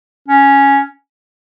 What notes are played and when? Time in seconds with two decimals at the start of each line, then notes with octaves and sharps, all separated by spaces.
0.28 C#4